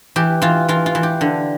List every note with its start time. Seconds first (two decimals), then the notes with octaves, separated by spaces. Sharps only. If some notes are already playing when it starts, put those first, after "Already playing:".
0.16 E3 G4
0.42 E3 F4
0.68 E3 F4
0.86 F4
0.95 E3
1.03 G4
1.21 D3